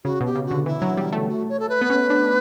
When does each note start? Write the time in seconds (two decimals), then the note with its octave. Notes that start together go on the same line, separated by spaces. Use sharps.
0.04 C#3 F#4
0.21 B2 G4
0.35 C#3
0.46 D3 F#4
0.66 E3 E4
0.82 F#3
0.97 G3
1.12 A3
1.28 F#4
1.49 C#5
1.60 A4
1.69 B4
1.81 B3
1.90 C#4
2.10 D4